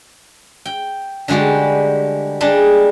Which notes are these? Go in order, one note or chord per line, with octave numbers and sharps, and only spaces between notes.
G5
D3 G3 G#3 F#4 G4
G3 G#3 D4